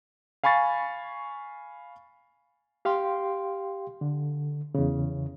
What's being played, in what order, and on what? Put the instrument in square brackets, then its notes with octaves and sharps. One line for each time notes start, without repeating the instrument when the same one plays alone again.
[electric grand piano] F5 G#5 B5 C#6 A6
[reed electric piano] G4 F5 G5 C6
D3
E2 C#3